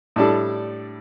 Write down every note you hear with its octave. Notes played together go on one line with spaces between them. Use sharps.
A2 G3 D4 A4